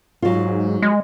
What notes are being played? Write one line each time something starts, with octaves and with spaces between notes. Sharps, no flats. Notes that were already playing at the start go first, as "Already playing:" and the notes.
G#2 F#3 F4
G#3